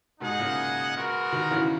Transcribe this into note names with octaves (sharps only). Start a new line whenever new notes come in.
G#2 B2 D#4 G#4 D#5 F#5
A#2 C#3
G#3 B3 F#4 A#4
B2 D#3
C#3 E3